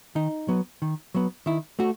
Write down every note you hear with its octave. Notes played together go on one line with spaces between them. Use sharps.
D#3 D#4
F#3 B3
D#3
F#3 B3
D#3 E4
A3 F#4